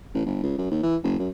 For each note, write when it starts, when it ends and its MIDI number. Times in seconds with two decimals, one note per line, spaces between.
0.14 0.24 33
0.26 0.41 31
0.43 0.54 37
0.58 0.66 42
0.71 0.83 39
0.83 0.96 52
1.04 1.15 30
1.19 1.29 42